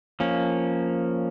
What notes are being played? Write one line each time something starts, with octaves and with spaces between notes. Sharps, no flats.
F3 A#3 C#4